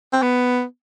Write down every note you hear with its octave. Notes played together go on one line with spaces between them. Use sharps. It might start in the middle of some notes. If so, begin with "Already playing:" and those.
C4
B3